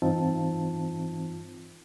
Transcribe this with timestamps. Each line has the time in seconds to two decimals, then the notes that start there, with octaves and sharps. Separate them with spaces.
0.02 G2 E3 C4 D#4 F4 A5